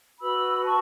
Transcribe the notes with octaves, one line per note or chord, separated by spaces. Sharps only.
F#4 B4 B5 E6
A5 C#6